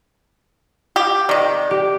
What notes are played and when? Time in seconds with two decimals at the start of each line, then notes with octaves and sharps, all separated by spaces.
0.96 G4
1.29 C3 D#3 G4 D5
1.71 G4